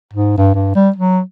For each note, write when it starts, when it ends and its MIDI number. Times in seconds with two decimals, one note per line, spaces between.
0.13 0.36 44
0.38 0.53 43
0.54 0.71 43
0.75 0.90 55
0.96 1.20 54